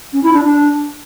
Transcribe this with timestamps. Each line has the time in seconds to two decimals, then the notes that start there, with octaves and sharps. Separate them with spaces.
0.13 C#4
0.23 E4
0.33 D4
0.44 D4